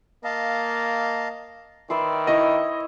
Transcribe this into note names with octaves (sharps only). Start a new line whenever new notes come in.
A#3 D#5 F5 A5
D#3 B4 D5 E5 C6
E4 C#5 D#5